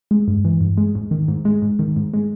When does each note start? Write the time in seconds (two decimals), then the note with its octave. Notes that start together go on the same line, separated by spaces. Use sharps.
0.11 G#3
0.28 G2
0.45 E3
0.61 G2
0.77 G#3
0.95 G#2
1.11 D#3
1.28 G#2
1.45 G#3
1.62 G#2
1.79 D#3
1.96 G#2
2.14 G#3